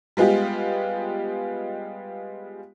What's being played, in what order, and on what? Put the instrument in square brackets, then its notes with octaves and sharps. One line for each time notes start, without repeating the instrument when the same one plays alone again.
[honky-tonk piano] G3 G#3 B3 F4 G4